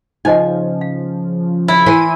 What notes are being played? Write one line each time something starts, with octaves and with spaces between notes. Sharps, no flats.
C#3 F3 D#4 C5 D#5 G#5
F5
E4
E3 C5 D#7